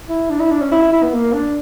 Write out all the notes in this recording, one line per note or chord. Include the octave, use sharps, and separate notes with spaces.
E4
D4
E4
D4
C#4
E4
E4
E4
B3
A#3
D4